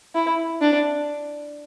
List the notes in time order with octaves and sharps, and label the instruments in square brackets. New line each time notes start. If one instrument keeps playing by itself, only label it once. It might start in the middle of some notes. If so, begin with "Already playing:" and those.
[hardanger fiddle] E4
D4